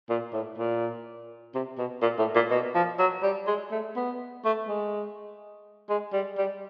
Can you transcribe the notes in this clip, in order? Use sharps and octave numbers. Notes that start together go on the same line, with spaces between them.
A#2
A2
A#2
C3
B2
A#2
A2
A#2
B2
F3
F#3
G3
G#3
A3
B3
A3
G#3
G#3
G3
G3